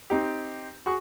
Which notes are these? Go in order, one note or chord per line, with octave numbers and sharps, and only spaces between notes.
C4 D#4 G4
F#4 G#4 C#6